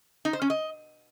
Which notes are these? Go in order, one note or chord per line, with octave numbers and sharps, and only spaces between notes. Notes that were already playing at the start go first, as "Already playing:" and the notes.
D#4
C5
C#4
D#5